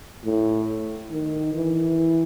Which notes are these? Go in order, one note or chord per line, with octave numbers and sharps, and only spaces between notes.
A2
D#3
E3